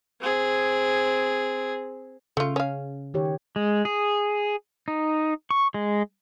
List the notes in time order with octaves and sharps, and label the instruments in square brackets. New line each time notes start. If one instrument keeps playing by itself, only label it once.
[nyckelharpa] C4 G#4
[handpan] C#3 [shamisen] A3 F4
[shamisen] C#4 F5
[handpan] D#3 G4 C#5
[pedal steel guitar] G#3
G#4
D#4
C#6
G#3